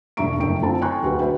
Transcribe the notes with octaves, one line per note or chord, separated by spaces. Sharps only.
E1 G2 E5 A#5 C#6 D7
F#1 D3 A3 G5 D7
A3 C4 F4 A5
G5 G#5 A#5 C6 C#6 F#6
D2 F#4 G#4 B4
B4 E5 G5